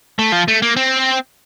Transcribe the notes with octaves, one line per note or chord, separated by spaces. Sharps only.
A3
F3
A3
A#3
C4